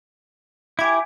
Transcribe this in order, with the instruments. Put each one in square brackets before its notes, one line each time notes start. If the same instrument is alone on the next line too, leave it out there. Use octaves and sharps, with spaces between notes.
[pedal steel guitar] E4 G4 [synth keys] G#5 G#6